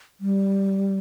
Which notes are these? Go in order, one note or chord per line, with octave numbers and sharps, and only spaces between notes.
G3